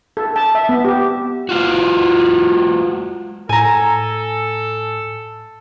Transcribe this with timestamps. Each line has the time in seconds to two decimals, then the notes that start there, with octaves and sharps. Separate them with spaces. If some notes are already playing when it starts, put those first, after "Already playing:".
0.17 A4
0.36 A5
0.55 E5
0.69 B3
0.85 G4
1.49 G#3 F4 F#4
3.49 A2 A4 G#5 A#5